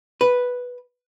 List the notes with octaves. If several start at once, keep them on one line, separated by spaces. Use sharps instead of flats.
B4